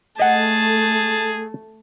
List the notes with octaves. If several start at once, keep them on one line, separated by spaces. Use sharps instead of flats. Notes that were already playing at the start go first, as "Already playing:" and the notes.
A3 G#4 D#5 F#5 A5